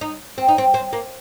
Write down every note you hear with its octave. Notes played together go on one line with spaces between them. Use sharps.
D#4
C4
D#4
C4
C4
A#3